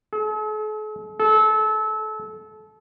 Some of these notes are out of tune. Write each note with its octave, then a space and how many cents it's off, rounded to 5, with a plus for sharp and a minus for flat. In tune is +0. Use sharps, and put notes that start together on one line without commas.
A4 -45
A4 -25